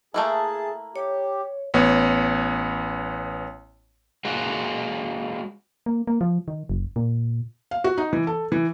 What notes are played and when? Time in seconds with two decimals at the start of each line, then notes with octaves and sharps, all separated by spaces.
0.14 A3 A#3 E4 G#4 A5
0.96 G4 C#5
1.74 A1 B3 C#5
4.25 G#3 A#3 F#4
5.86 A#3
6.07 A#3
6.21 F3
6.48 D#3
6.69 F#1
6.96 A#2
7.71 F5
7.84 F#4
7.98 D#4
8.13 E3
8.27 A4
8.52 E3